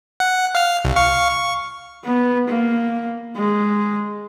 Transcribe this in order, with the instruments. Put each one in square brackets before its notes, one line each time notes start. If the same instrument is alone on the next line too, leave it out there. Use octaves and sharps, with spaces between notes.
[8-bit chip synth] F#5
F5 F6
C2
F5 C#6
C#6
[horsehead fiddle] B3
A#3
G#3